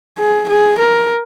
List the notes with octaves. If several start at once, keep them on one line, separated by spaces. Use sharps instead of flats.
G#4
G#4
A#4